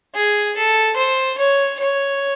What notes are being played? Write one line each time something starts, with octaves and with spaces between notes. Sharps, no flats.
G#4
A4
C5
C#5
C#5